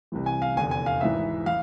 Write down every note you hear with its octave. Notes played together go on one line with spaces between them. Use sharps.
C2 C3 E3
G#5
F5
F1 E2 D3 G#5
G#5
F5
G#1 G#2 E3 E5
E3 F5